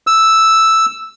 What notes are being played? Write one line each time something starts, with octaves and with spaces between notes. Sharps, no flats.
E6